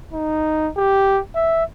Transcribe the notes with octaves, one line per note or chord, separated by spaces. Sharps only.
D#4
G4
E5